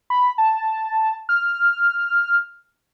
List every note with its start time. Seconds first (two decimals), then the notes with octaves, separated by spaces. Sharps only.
0.10 B5
0.38 A5
1.29 F6